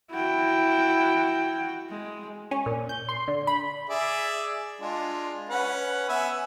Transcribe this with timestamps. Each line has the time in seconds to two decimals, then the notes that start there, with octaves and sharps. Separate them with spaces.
0.11 E4 F#4 G5
1.90 G#3
2.51 C#4
2.66 A#2
2.89 G6
3.09 C6
3.28 D3
3.47 B5
3.90 G#4 D5 E5
4.81 G#3 D4 F4
5.49 C#4 B4 F#5
6.09 B3 E5 G#5